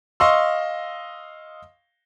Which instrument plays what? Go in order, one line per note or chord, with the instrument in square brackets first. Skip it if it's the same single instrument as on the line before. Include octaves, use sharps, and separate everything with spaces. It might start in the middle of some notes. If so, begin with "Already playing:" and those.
[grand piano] D#5 F5 C6 C#6 E6